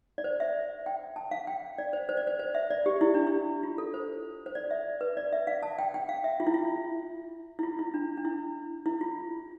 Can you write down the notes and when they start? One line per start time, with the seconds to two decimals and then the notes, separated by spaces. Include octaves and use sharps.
0.18 D5
0.24 C5
0.40 E5
0.86 G5
1.16 A5
1.31 F5
1.47 G5
1.78 D5
1.93 C5
2.09 C5
2.17 D5
2.27 C5
2.39 C5
2.55 E5
2.71 D5
2.86 G4
3.01 E4
3.14 D4
3.27 E4
3.63 F4
3.78 A4
3.94 C5
4.46 C5
4.55 D5
4.71 E5
5.01 B4
5.17 D5
5.33 E5
5.47 F5
5.63 A5
5.79 G5
5.94 G5
6.09 F5
6.24 E5
6.40 F4
6.47 E4
6.54 F4
7.59 E4
7.63 F4
7.79 E4
7.94 D4
8.17 D4
8.25 E4
8.86 E4
9.01 F4